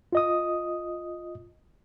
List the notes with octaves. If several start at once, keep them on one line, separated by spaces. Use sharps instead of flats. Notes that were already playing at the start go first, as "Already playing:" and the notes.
F4 D#5 D#6